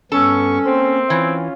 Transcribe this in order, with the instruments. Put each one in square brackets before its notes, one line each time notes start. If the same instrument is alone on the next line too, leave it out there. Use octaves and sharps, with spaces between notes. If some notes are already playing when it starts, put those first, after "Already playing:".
[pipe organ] G2 B3 C#6 [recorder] C#4 [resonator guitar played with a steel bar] A4
[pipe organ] A#3 [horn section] C4
[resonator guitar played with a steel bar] E3 [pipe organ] C#4 F4